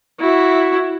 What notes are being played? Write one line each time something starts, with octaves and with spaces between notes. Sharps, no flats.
E4 F#4